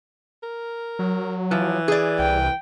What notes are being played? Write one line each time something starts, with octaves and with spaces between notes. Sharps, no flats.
A#4
F#3
E3 F3
G#4 D5
C2 G5